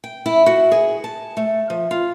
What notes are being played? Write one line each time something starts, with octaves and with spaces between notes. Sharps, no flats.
G5
E4
F#4
G#4
A5
A3
F3
F4